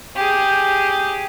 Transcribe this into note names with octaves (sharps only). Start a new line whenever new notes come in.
G4 G#4